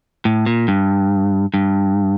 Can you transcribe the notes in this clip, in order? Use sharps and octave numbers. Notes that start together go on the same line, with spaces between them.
A2
A#2
G2
G2